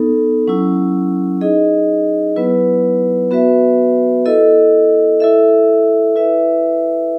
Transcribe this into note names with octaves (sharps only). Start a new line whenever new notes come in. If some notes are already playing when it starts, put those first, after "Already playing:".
Already playing: B3 D#4 A4
F#3 C#4 E4
D#4 G#4 D#5
F#3 B3 E4 B4
B3 F#4 B4 E5
E4 A4 D#5
E4 A4 E5
E4 B4 E5